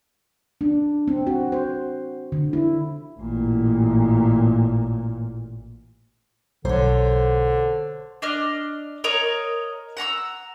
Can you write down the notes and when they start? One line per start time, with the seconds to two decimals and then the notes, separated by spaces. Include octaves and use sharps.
0.61 D4
1.08 C4
1.27 F#4
1.52 C5
2.32 D3
2.53 E4
3.19 A1 A#2
6.65 B1 D3 C5 C#5
8.22 D4 D#5 F6
9.04 A#4 C#5 D#5 A#5
9.97 F#5 A#5 C#6 E6